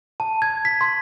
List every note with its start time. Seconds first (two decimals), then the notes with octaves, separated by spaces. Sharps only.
0.20 A5
0.42 G#6
0.65 B6
0.81 C6